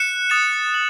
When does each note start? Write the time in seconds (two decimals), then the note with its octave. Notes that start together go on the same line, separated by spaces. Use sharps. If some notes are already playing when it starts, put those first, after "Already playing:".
Already playing: F#6 C#7 E7
0.30 D#6 A6 E7
0.74 F#7